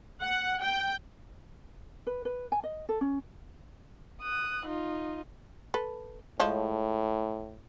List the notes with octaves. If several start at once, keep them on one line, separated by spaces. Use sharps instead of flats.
F#5
G5
B4
B4
G#5
D#5
A4
C#4
D#6 F#6
D#4 F4
A4 B4
A2 F3 G#3 C#5